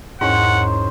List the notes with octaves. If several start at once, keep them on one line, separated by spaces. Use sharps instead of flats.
E2 G#2 D#3 C#4 C5 F#5